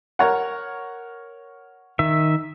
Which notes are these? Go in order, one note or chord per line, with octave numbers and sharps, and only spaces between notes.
A#4 C#5 F#5
D#3 E5